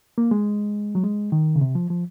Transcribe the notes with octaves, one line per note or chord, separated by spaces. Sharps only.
A#3
G#3
F#3
G#3
D#3
C#3
C3
F3
F3